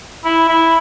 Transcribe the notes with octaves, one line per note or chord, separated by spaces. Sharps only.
E4
E4